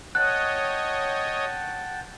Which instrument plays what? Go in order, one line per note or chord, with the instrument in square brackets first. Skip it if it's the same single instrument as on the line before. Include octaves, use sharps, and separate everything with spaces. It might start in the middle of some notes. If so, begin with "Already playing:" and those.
[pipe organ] C#5 D#5 [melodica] F#5 G5 A5 [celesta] F#6